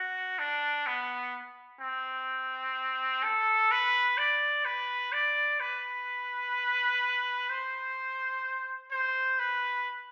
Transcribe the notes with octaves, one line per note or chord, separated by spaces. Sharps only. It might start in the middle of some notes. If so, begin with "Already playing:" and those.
Already playing: F#4
D4
B3
C4
A4
B4
D5
B4
D5
B4
C5
C5
B4